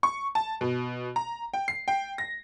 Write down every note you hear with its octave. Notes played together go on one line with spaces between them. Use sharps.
C#6
A5
B2
A#5
G5
C7
G5
A#6